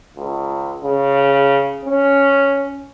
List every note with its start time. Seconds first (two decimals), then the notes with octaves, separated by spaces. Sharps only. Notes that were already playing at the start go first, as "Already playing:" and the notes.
0.17 C#2
0.85 C#3
1.85 C#4